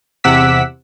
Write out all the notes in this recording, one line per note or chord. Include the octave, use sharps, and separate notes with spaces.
E2 C3 F#5 D6 E6 B6